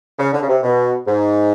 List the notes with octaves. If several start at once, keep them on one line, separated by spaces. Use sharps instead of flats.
C#3
D3
C#3
C3
B2
G#2